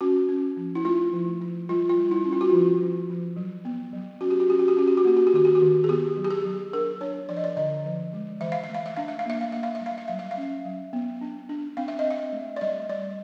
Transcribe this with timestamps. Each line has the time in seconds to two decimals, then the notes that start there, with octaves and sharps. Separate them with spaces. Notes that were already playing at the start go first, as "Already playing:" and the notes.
0.01 C#4 F#4
0.29 C#4
0.57 F3
0.75 E4
0.84 A3 F4
1.13 F3
1.41 F3
1.69 G3 F4
1.89 F4
1.97 G3
2.11 E4
2.25 C#4
2.33 F4
2.41 F#4
2.50 F3 F4
2.80 F3
3.09 F3
3.36 F#3
3.65 B3
3.93 F#3
4.21 C#4 F#4
4.30 G4
4.40 F#4
4.48 C#4 G4
4.59 F#4
4.68 G4
4.77 C#4 F#4
4.88 G4
4.97 F#4
5.05 A#3 G4
5.17 F#4
5.27 G4
5.34 D#3 F#4
5.45 G4
5.55 F#4
5.62 D#3
5.84 G#4
5.88 B3 G4
6.17 F#3
6.25 G4
6.30 G#4
6.45 F#3
6.73 D4 A#4
7.01 D4 C#5
7.29 F3 D5
7.37 D#5
7.44 D5
7.57 D3 D#5
7.86 F3
8.13 G#3
8.41 E3 E5
8.52 F5
8.64 E5
8.69 A3
8.75 F5
8.86 E5
8.96 D4 F5
9.08 E5
9.19 F5
9.26 A#3 E5
9.41 F5
9.52 A#3 E5
9.63 F5
9.75 E5
9.81 G3 F5
9.98 E5
10.08 F#3 F5
10.19 E5
10.31 F5
10.37 C#4 E5
10.65 F#3
10.93 B3
11.21 D4
11.49 D4
11.77 C4 F5
11.88 E5
11.99 D#5
12.05 C4
12.11 E5
12.33 A3
12.56 D5
12.61 G3 D#5
12.89 G3 D5